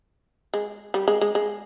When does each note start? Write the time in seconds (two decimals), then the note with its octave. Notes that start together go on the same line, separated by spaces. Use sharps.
0.54 G#3
0.94 G3
1.08 G#3
1.21 G#3
1.35 G#3